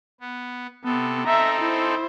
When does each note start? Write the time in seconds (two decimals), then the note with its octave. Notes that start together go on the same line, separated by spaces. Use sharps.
0.21 B3
0.85 C3 B3 A4
1.26 C4 D#4 A4 E5 A#5
1.61 E4 C5